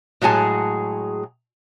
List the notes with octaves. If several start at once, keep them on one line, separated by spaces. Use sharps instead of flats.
A2 F#3 G#3 G#4 A5